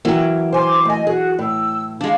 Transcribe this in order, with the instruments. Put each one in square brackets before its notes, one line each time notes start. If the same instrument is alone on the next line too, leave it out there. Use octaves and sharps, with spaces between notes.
[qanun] E3 F#3 C#4 [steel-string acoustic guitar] A#3 E5 G5
[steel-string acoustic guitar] C5 G#5 [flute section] C6 D6
[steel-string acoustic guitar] A3 G#5 [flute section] D#5
[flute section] F#4 [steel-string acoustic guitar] G#4
[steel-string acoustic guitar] A2 [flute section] E6
[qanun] G#3 D4 [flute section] F5